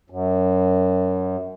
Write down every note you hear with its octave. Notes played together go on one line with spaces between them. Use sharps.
F#2